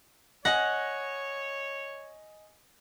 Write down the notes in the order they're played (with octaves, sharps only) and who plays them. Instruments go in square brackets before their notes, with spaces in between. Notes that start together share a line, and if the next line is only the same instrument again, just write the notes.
[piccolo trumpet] C#5 [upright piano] D#5 G#5 A#6 [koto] F#5